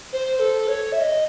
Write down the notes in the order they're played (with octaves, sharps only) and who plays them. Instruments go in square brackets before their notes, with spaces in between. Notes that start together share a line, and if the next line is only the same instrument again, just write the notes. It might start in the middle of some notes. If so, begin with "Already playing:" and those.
[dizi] C5
C5
A4
C#5
E5
D#5